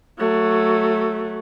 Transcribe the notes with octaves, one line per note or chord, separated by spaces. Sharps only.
F#3 A3